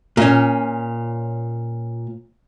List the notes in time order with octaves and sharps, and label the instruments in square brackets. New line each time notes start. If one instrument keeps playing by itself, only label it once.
[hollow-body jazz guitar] A#2 C#4